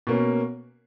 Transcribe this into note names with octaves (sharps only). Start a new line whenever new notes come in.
B2 A#3 C#4